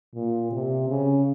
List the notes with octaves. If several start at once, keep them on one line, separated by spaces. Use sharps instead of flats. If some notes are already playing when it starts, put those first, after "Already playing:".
A#2
C3
C#3